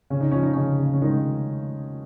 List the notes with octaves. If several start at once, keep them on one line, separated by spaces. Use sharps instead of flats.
C#3 C#4
D#4
F3 C#4
D#4
C#3 C#4
C#3
C#4
D#3 G#3 D#4